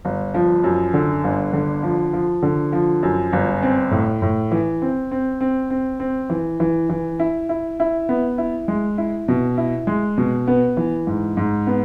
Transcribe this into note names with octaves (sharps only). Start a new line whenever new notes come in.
G1
F3
F#2
D3
G1
D3
F3
F3
D3
F3
F#2
G1
C4
A2
A2
E3
C4
C4
C4
C4
C4
E3
E3
E3
E4
E4
E4
B3
E4
G#3
E4
B2
E4
G#3
B2
B3
E3
G#2
G#2
B3